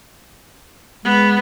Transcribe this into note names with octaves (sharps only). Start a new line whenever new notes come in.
G#3 B3